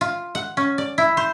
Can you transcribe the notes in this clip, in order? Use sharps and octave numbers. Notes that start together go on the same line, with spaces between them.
F4
F#5
C#4
D5
E4
C5